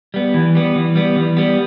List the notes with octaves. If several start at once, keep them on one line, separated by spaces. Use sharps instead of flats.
G3 B3
E3
G3 B3
E3
G3 B3
E3
G3 B3